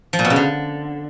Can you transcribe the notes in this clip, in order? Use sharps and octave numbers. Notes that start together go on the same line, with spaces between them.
F3
A#2
B2
C#3
D3